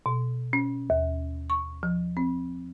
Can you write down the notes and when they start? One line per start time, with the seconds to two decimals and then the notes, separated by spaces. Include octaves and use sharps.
0.06 B2
0.53 C#4
0.90 D#2
1.50 C#6
1.83 F3
2.17 C4